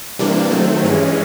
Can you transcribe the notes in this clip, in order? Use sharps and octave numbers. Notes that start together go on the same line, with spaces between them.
C3 E3 G3 A#3 D4
D#3 F#3 A3 C4
G2 E3 G#3 C#4